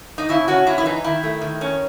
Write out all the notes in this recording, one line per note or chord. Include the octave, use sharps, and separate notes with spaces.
D#4
C#3 E4
C#4 F#4
C#4 E4
E4
E3 D#4
D#3 E4
A3
D#3
C#4